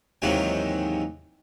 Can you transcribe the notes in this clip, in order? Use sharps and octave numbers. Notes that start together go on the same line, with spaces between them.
D#2 G#2 C3 D#3 E3 F#3